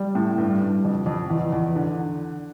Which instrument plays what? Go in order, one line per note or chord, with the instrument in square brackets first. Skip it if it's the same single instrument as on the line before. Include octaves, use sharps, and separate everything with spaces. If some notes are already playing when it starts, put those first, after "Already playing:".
Already playing: [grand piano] G3
A2
G2
G2
F2
F2
E2
E2
D3